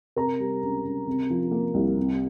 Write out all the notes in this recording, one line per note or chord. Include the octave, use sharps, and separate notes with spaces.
C3 A#4 A#5
G3
C#2
C#2
C3
F3
A#3
C2
C3